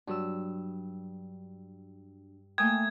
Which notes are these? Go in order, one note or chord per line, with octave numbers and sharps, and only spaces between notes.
G2 F#3 D4 E6
A3 A#3 G5 G#5 D#6 G#6